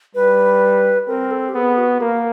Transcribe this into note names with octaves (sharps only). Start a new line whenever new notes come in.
G3 B4
C4 A#4
A4
G4
B3 G#4
F#4
A#3 A#4